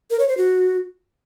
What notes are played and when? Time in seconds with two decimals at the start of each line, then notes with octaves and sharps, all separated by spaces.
0.10 A#4
0.19 C#5
0.28 C5
0.38 F#4